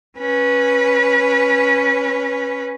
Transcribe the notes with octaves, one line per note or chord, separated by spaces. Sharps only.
C#4 B4